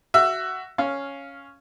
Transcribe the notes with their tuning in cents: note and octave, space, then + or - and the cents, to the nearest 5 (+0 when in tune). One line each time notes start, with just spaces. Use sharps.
F#4 +10 E5 +15
C#4 +0 F5 +0